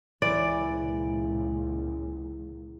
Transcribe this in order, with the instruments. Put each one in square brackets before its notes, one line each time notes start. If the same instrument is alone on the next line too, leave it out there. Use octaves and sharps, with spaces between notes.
[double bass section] C#2 A#2 [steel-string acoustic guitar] E3 [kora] D5